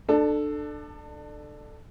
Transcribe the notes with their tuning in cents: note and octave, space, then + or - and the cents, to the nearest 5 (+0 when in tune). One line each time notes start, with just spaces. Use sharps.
D4 +25 A4 +0